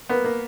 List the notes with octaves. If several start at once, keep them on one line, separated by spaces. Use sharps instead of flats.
A#3 B3
A#3